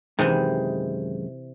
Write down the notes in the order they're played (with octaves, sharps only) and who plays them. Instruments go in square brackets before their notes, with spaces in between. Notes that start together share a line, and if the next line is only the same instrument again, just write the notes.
[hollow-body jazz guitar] F#2 D#3 G#3 [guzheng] C3 E3